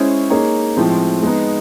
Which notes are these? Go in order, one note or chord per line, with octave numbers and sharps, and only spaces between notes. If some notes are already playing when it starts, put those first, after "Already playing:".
Already playing: G#3 C#4 E4 G#4 C5
A#3 D#4 G#4 C#5
A2 F3 G#3 C4
G#3 B3 D#4